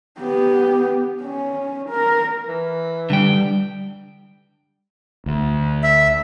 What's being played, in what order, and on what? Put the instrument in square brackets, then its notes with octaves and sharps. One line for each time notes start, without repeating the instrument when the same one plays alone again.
[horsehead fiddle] B3 G4
C#4
A#4
[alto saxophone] E3
[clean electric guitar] D3 G5 [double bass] G3
[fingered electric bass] D2
[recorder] E5